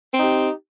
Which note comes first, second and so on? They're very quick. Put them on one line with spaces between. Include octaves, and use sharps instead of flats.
C4 D#4 G4